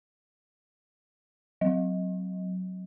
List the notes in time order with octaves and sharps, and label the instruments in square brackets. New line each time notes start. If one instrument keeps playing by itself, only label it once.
[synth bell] F#3